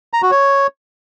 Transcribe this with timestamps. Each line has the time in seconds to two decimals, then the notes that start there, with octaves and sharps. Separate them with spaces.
0.13 A#5
0.22 F#4
0.31 C#5